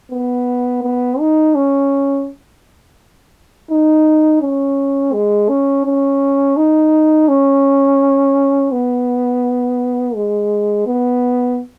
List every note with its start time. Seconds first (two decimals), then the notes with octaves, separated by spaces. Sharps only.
0.12 B3
0.83 B3
1.19 D#4
1.55 C#4
3.70 D#4
4.41 C#4
5.13 G#3
5.49 C#4
5.85 C#4
6.57 D#4
7.28 C#4
8.72 B3
10.15 G#3
10.87 B3